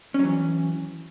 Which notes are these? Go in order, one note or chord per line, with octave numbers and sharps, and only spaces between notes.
E3 F#3 C#4